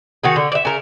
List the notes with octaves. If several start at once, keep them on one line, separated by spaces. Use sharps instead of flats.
D#3 F#4 G#4
D3
D5 E5
C#3 A#4